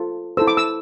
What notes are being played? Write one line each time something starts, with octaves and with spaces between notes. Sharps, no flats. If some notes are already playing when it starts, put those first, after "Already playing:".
Already playing: F4 A4 C5
E4 A4 C5 E6
D6
E6